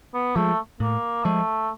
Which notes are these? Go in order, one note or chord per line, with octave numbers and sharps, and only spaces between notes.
B3
F3 G#3 A3
A2 A#3
F3 G#3 A3